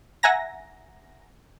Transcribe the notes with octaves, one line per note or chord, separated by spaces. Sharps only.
E5 F#5 G#5 A#5 A#6